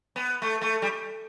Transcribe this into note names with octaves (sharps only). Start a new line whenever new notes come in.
B3
A3
A3
G3